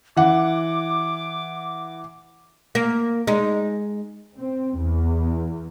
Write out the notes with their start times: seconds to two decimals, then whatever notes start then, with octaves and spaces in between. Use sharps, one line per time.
0.17 E3 F#5 D6
2.75 A#3
3.27 G#3 D#4
4.37 C4
4.78 E2